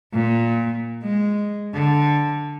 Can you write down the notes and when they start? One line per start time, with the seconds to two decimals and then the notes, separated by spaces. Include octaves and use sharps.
0.13 A#2
1.03 G#3
1.74 D3